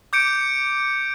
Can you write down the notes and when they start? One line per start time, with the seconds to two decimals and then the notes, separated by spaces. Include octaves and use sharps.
0.13 D6 G6 C#7 D7